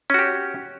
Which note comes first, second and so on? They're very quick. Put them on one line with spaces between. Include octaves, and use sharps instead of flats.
C#4 F#4 G4